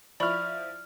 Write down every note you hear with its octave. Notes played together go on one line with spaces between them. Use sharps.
F3 E4 D5 B5 C#6 F6